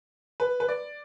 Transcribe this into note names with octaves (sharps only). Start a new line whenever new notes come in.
B4
B4
D5